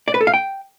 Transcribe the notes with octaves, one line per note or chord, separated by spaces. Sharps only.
D5
B4
A4
F5
G5